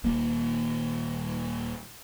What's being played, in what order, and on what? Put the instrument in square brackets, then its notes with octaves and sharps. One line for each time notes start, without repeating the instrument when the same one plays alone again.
[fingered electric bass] D#1 D#2 A#3